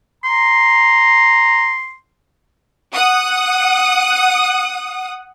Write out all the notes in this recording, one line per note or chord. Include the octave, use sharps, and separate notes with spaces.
A#5 C6
F#5 D#6